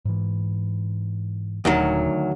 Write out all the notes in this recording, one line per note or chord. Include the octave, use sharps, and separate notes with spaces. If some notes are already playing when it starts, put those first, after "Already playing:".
G#2 E3
D#1 D2 D#3 F#3